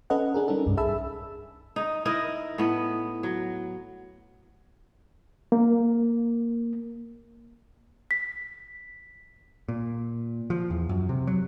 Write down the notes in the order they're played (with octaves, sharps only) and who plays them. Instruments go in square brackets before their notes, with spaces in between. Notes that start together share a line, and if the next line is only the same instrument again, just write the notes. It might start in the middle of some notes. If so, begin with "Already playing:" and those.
[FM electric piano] C#4 A4 B4 D#5 F#5
D4 G#4 A#4
G3 C#4 D#4 A4
C2 G2
G#4 E5 A5 B5 E6
[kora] D#4
D#4 E4 A#4 D#5
A2 B3
F#3
[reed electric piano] A#3
[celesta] B6
[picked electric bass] A#2
F3
E2
F#2
C3
F#3